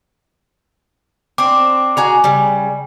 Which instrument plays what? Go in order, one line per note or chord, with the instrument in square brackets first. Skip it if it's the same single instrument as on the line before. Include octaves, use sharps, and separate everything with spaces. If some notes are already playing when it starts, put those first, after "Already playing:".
[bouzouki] C4 D4 [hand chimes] D6
[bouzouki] F#4 G#4 A#5
C#3 G3